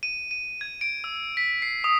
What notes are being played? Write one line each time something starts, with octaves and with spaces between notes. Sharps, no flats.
D#7
D#7
G#6
D7
E6
B6
C7
D#6